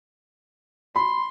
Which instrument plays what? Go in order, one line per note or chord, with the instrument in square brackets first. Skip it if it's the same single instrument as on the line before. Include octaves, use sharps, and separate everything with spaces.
[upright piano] B5 [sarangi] C6